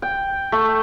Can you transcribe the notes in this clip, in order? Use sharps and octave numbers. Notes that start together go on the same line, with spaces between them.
G5
A3